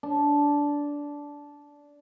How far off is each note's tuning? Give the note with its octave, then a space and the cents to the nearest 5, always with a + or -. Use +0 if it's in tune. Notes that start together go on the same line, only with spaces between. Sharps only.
D4 -15